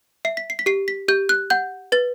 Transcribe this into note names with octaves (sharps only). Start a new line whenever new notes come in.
E5 C7
B6
C7
B6
G4 C7
B6
G4 G6
F#6
F#5 G6
B4 A6